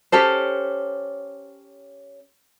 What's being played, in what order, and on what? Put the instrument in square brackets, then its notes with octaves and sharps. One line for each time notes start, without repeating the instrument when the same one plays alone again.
[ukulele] C#4 G4 A4 C5